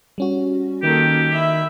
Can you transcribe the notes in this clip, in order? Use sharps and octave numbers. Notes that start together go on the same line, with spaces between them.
G3 C#4 F#4
D#3 A#3 G4 A4
E4 E5